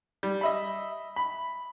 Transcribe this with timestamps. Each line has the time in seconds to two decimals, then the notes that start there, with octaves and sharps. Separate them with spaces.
0.23 G3
0.41 D#5 E5 B5
1.16 B5